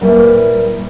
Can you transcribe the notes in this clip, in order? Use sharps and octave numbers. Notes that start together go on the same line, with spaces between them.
A#2 G3 E4 B4 E5